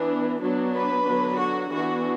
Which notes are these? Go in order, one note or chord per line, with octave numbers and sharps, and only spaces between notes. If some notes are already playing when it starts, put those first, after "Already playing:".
Already playing: E3 B3 D4
F#3 B3 D4
B4
D3 F#3 B3 D4
F#4
E3 B3 D4 F#4